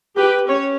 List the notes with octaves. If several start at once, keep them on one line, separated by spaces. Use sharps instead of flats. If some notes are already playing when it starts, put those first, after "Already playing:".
G4 B4
C#4 C#5